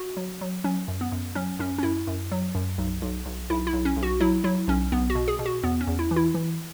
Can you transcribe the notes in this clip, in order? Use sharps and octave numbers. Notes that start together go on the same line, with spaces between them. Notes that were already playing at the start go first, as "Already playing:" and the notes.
Already playing: F#4
F#3
F#3
F#3 C#4
F#2
B3
F#2
F#3 C#4
F#2 C#4
C#4
F#2 E4
F#2
F#3
F#2
B1
B1
B1
B1 E4
E4
B1
C#4
B1
F#4
F#3 E4
F#3 E4
B1 C#4
B1 B3
F#4
B2
G#4
B2
F#4
E2 B3
C#4
E2
E4
E3
E4
E3